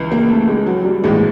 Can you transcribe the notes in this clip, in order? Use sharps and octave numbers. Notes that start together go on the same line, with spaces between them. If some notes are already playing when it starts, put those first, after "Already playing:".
Already playing: C#2 C#3 E3
A#3
A3
G#3
F#3
G3
A#1 A2 E3 G#3